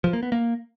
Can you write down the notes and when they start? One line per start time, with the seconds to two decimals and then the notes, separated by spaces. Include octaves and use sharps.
0.04 F3
0.13 A#3
0.23 B3
0.32 A#3